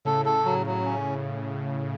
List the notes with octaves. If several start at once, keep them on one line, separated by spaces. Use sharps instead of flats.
A2 C#3 A4
A4
F#3
F#3
C#4